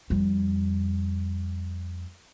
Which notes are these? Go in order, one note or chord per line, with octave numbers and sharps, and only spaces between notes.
F2 G3